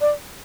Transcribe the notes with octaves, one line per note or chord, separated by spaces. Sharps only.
D5